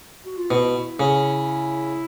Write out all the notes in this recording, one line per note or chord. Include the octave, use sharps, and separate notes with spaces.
F#4
F4
B2 E4
C#3